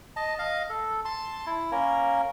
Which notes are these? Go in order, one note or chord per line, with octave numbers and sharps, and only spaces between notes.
D#5 A5
D#5 F5
A4
A5 C6
E4
A#3 C#4 A#4